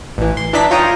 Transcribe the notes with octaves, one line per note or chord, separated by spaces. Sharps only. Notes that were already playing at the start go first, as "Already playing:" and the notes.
A1 E3
C6
E3 D4 D#4 A5 B6
F4 C#5 G5 A#5 D#6